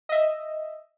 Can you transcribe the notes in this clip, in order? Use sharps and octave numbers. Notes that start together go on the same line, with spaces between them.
D#5 E5